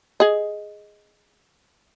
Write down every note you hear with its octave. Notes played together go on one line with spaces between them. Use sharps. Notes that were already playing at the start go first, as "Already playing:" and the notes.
G#4 D#5